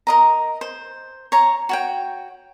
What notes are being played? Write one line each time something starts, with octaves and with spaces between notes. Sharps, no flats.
A#4 D#5 A#5
C5
C#5 A#5
F#4 C#5 G5